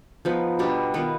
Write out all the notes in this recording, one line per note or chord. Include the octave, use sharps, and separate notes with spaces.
F3 B3 D#4 B4
B2 G3 D4 G4
D#3 B3 F4